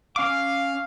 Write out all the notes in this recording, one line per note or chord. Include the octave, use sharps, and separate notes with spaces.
C#4 F5 D6